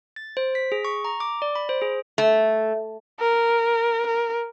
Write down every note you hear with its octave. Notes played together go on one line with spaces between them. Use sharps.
A6
C5
B6
G#4
C#6
A#5
D6
D5
B5
C5
G#4
A3
A#4
A#4